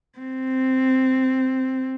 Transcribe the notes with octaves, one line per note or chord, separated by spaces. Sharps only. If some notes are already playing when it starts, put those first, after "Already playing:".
C4